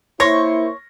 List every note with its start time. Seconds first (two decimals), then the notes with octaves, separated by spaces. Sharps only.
0.20 A#3 E4 C5 C#5 C6 C#6 A#6